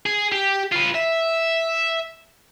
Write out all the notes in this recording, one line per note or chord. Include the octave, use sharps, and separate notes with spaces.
G#4
G4
F4 B4
E5